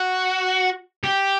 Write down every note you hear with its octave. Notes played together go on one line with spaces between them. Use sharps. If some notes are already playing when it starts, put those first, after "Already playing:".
Already playing: F#4
G4